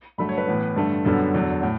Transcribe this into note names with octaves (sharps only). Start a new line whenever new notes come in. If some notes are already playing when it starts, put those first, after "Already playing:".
G2 D3 F#3 A3 B5
C#5
B4
A2 E3 B3
G2 D3 A3
F#2 D3 G3 B3 A4
E2 D3 F#3
A2